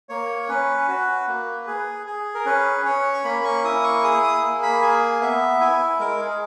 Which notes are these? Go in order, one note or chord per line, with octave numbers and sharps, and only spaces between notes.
A#3 C#5
C#4 B4
F#4
A#3
G#4
G#4
A#4
C#4 B4
C#4 C#5
C#6
A#3 B5
C#6
E4 D#6
C#6
G#4 D#6
D#6
A#3
B5
G#4 G#5
B3 E5
E4 G#5
G#3 A#4
G#4